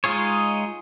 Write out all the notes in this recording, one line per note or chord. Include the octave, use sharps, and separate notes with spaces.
G#3 D#4 F4 G#4 C#5